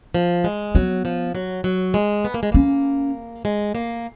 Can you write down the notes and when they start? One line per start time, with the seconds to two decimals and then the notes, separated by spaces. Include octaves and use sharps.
0.15 F3
0.44 G#3
0.75 F#3 B3
1.05 F3
1.35 F#3
1.64 F#3
1.94 G#3
2.25 B3
2.34 A#3
2.43 G#3
2.52 A#3 C#4
3.45 G#3
3.75 A#3